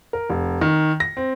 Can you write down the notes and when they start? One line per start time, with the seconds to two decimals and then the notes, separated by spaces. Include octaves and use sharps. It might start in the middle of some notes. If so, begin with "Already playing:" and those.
0.13 A#4
0.30 F1
0.61 D#3
1.00 A#6
1.17 C4